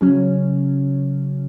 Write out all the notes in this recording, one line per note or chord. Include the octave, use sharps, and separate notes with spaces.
C#3 F#3 C#4